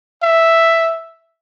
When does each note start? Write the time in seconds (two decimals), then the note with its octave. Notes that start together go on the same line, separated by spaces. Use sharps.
0.23 E5